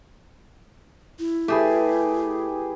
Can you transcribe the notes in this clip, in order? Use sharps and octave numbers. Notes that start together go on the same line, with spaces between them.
E4
A3 G4 G#4 B4